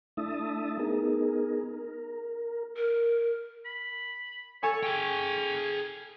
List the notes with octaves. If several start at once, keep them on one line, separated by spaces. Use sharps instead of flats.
A3 D4 E4 E5 A5 D#6
B3 D#4 G#4 A#4
A#4
A#4
B5
A4 C#5 G#5 C#6
C#4 G#4 G5